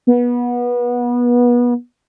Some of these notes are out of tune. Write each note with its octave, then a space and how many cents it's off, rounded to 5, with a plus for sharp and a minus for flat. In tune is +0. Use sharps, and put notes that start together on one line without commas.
B3 -25